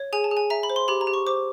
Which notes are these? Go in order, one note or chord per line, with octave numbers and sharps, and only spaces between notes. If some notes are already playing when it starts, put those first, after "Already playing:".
Already playing: C#5
G#4 G#5
A5
G#4
G#5
E5 A#5
B5
C5
C6
G4 B5
A#5
G4
C#6
C5 D6